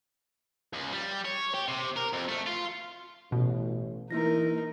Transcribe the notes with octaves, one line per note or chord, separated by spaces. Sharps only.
C#2
G3
C#5
G4
C3
A#4
F2
A3
F4
A1 B2
E3 A#3 D#4 E4 A#4 A#6